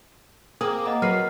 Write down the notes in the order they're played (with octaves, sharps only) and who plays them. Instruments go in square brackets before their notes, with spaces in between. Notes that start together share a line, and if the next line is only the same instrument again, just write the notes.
[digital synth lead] A#3 [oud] C4 G#4 [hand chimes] D6 D#6
[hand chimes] D#5 F#5 A#5
[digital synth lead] F#3 [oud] A#4 B4 [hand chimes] F6 C7